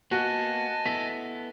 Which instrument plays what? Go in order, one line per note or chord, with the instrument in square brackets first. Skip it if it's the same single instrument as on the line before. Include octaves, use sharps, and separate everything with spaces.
[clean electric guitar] A#3 B3 [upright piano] F#4 [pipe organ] D#5 G#5 [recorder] A5
[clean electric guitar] B3 E4 A4 [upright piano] B6